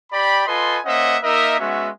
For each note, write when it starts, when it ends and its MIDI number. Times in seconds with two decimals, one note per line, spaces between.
0.12 0.43 67
0.12 0.43 74
0.12 0.43 79
0.12 0.43 83
0.47 0.79 65
0.47 0.79 69
0.47 0.79 71
0.47 0.79 75
0.47 0.79 80
0.47 0.79 84
0.85 1.18 58
0.85 1.18 61
0.85 1.18 72
0.85 1.18 75
0.85 1.18 76
0.85 1.18 78
1.24 1.58 58
1.24 1.58 63
1.24 1.58 70
1.24 1.58 75
1.24 1.58 76
1.60 1.89 56
1.60 1.89 59
1.60 1.89 61
1.60 1.89 66
1.60 1.89 76